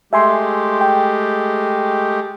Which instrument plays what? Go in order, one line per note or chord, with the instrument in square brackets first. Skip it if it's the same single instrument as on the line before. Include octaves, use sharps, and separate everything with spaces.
[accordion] G#3 A3 G4 [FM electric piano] E5 G#5 C6
[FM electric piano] G5